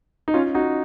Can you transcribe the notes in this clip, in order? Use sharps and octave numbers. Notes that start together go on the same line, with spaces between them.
D#4
C#4 F4
D#4 F#4